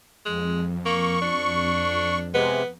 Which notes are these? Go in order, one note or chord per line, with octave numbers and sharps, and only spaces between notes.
F2 G#3
A#3 C#6
D4
C3 G#3 B3